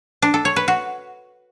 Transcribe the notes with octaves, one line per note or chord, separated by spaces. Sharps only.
D4
A4
C#5
B4
F#4